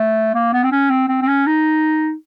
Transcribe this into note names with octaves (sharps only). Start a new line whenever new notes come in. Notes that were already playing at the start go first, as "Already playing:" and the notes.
Already playing: A3
A#3
B3
C4
C#4
C4
C4
C4
C#4
D#4